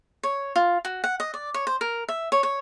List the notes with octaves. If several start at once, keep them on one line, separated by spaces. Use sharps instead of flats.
C#5
F4
F#4
F#5
D#5
D5
C#5
C5
A#4
E5
C#5
C#5